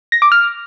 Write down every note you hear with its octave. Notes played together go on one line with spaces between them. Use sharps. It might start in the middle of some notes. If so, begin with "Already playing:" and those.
A#6
D6
F6